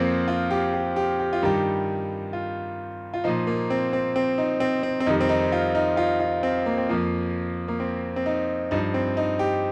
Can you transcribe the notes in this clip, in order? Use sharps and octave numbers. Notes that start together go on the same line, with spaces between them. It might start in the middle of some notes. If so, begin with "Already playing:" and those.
Already playing: F2 F3 A#3 C4
F4
G4
G4
G4
G4
F4
G2 D#3 G3 G4
F4
F4
A#2 F3 D#4
A#3
C4
C4
C4
D#4
C4
C4
C4
F2 D#3 G3 D#4
C4
D#4
F4
D#4
F4
F4
C4
A#3
C4
F2 F3 A#3
A#3
C4
C4
D#4
G2 F3 D#4
C4
D#4
G4